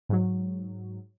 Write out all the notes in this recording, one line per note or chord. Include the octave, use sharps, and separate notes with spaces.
G#2 F#3